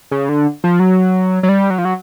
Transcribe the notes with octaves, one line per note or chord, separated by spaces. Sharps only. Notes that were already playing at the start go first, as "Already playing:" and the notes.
C#3
D3
F3
F#3
F#3
G3
F#3
F3
F#3